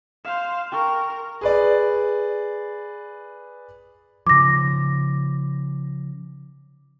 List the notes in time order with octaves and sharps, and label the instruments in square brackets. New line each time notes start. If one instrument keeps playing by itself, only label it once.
[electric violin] C5 F5 [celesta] E7
[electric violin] A#4 [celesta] G5 C#6
[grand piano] G#4 B4 D5
[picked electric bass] C#3 F3 [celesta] D6 A#6